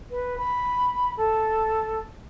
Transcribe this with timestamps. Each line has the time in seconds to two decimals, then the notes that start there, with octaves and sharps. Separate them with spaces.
0.11 B4
0.38 B5
1.18 A4